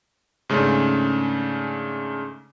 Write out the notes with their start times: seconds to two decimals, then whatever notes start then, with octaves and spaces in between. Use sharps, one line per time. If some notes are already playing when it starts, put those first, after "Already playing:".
0.49 G#2 C#3 A3 C#4 D4